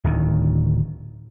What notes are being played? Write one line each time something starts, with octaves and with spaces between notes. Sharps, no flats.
D1 D2 D#3